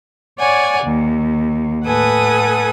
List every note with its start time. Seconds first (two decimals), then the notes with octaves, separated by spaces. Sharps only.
0.39 C#5 D5 F#5 G#5
0.84 D#2
1.85 A2 A4 B4 F#5 G#5 D#6